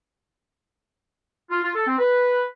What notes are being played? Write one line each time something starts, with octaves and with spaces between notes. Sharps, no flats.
F4
F4
A4
C4
B4